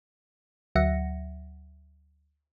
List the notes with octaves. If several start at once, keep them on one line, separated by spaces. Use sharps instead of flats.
D2 F#3 E5 F#5 A#6 C#7